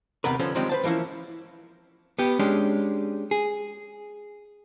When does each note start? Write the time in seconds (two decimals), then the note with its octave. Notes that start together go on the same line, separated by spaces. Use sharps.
0.24 D#2 C3 B3 A#4 B4
0.39 D3 F3 B3 C#4 A4 C5
0.55 D#3 F3 G3 G#3 C4 C#4
0.69 B4 C5 A5
0.83 E3 F3 A#3 C#4 E4
2.19 B3 G4
2.39 G#3 C#4 D4 G4
3.31 G#4